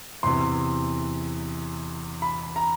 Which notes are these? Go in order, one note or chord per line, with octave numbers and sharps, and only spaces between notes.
E2 C3 E3 C6
B5
A#5